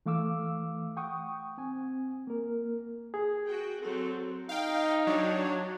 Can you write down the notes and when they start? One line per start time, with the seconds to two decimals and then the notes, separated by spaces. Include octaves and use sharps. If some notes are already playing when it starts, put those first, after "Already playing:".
0.06 E3 A3 F5 D6 E6
0.97 F#5 G5 C#6 D#6
1.58 C4 G#5
2.27 A#3 A#4
3.14 G#4
3.46 F#4 G5
3.82 F#3 C4 A4
4.49 D#4 F5 G5
5.07 F#3 D4 C#5